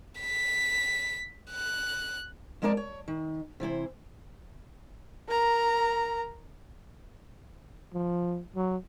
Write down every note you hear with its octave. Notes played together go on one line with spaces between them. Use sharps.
B6
F#6
F2 G#3 A#3 A#4 D5 A5
C#5
D#3
C3 E3 E4 C5
A#4 A#5
F3
F#3